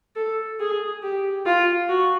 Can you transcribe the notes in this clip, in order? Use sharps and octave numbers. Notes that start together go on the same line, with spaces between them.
A4
G#4
G4
F4
F#4